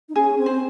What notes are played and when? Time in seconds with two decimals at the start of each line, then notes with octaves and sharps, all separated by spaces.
0.09 D#4
0.16 C#4 G#4
0.38 C4
0.46 C5